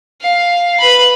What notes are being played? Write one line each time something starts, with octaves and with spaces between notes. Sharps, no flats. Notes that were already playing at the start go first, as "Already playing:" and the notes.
F5
B4 B5